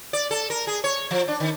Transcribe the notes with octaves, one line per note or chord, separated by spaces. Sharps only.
D5
A4
A#4
G#4
C#5
F3
D4
D#3